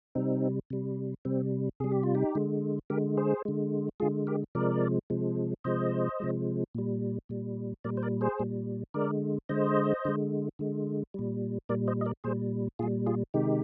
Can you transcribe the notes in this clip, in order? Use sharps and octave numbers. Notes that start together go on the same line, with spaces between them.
C3 G3 C4 D#4
C3 G3
C3 G3 C4
C3 G3 G#4
G4
F4
D#4 G4
D3 G#3
D3 G#3 G4 A#4
G#4 C5
D3 G#3
D3 G#3 F4 G#4
G4 A#4
C3 F3 G#3 A#4 D5
C3 F3 G#3
C3 F3 G#3 C5 D#5
C3 F3 G#3
A#2 G3
A#2 G3
A#2 G3 A#4 D5
C5
A#4 D5
G#4 C5
A#2 G3
D3 G#3 A#4 D5
D3 G#3 C5 D#5
D3 G#3
D3 G#3
A#2 G3
A#2 G3 A#4 D5
C5 D#5
D#5
A#4 D5
A#2 G3 G#4 C5
A#2 G3 F4 G#4
F4 G#4
C3 D#3 G#3 D#4 G4